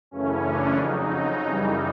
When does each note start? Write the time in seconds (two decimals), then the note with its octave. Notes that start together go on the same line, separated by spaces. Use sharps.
0.11 F#2 C#3 E3 A3 C#4
0.44 D4
0.77 F2 C#3 F#3 D#4
1.44 F#2 C#3 E3 G3